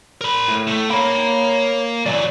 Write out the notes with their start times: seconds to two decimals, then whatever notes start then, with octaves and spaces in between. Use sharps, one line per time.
0.21 A#4 B5
0.49 A2
0.67 A3
0.91 A#3 C#5 B5
2.06 E3 F#3 D5